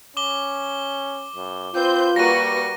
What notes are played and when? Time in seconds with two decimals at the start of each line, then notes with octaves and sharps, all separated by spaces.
0.17 C#4 D6 G7
1.36 F#2
1.75 C4 F4 B4 C5 G6
2.16 G3 A#3 F#4 B4 A#6 D#7